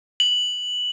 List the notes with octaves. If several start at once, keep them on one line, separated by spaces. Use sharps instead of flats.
F#7